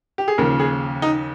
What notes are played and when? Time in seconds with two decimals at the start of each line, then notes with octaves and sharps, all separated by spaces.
0.18 G4
0.28 G#4
0.38 D#2 C#3 F3 A#4
0.59 G#4
1.02 D#4